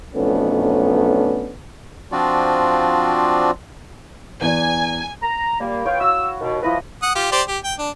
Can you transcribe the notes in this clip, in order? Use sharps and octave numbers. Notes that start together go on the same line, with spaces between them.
B1 F2 A3 B3 C#4 D4
F3 C4 D4 F4 F#4 D5
E2 D5 G#5
A#5
A#2 G3 A#3 B5
B3 F4 C#5 F5 G5
F#4 E6
D#2 B2
F3 E4 B4 D#5 D#6
F#5 D#6
F4 G4
G4 C5 D5
G4
G5
D4